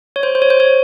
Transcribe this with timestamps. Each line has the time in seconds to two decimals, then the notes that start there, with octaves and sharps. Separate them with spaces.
0.16 C#5
0.23 C5
0.35 C5
0.42 C#5
0.50 C5
0.60 C#5